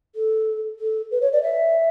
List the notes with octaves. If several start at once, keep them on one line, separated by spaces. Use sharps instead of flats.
A4
A4
B4
C#5
D5
E5